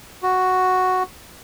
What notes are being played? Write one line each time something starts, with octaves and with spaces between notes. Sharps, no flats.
F#4